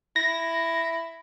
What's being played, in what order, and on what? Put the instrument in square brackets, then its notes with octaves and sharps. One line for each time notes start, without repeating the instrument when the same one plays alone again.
[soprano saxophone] E4 [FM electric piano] A#6